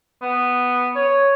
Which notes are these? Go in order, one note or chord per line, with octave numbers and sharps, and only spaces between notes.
B3
C#5